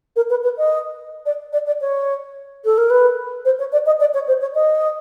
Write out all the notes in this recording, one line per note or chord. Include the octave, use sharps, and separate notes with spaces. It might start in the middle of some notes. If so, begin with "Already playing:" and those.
A#4
B4
B4
D#5
D5
D5
D5
C#5
A4
A#4
B4
C5
C#5
D5
D#5
D5
C#5
C5
C#5
D#5